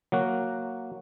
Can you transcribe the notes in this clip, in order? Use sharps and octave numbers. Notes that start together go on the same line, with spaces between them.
F#3 A#3 F#4